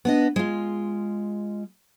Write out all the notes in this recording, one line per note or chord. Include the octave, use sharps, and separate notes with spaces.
B3 D4 D#5
G#3 F4